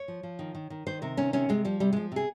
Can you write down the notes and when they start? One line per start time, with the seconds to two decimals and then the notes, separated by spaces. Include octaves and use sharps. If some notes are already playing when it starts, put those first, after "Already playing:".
Already playing: C#5
0.08 F3
0.23 F3
0.39 D#3
0.55 D#3
0.70 D#3
0.86 D#3 C5
1.02 C3 A#4
1.17 D#3 C#4
1.33 C3 C#4
1.49 C3 G#3
1.65 F3 G3
1.80 C3 G3
1.93 F3 G#3
2.12 C3 G#4